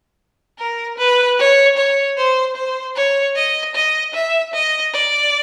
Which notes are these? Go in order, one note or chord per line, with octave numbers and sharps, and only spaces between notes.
A#4
B4
C#5
C#5
C5
C5
C#5
D#5
D#5
E5
D#5
D5